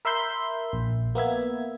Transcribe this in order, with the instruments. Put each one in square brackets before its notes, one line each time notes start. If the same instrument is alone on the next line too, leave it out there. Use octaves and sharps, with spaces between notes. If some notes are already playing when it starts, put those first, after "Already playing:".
[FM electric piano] A#4 E5 B5 C6 G6
A#1
A#3 B3 E5 G#6